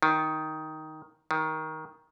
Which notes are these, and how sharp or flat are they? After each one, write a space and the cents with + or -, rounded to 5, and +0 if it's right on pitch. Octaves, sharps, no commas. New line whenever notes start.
D#3 +5
D#3 +15